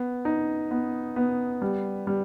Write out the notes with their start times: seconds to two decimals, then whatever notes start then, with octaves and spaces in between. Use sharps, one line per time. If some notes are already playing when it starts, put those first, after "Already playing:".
Already playing: B3
0.25 D#4
0.71 B3
1.16 B3
1.62 G3
2.07 G3